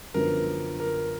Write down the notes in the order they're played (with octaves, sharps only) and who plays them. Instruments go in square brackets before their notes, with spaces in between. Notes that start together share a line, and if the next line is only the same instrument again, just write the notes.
[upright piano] F#2 D3 F3 B3 [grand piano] A#4
[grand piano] A#4